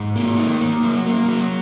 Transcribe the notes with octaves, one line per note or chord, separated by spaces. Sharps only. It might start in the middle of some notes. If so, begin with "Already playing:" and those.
Already playing: G#2
A#3
D#4
A#3
F#3
A#3
F#3